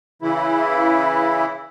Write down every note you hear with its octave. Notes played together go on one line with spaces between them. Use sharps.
C#3 E3 E4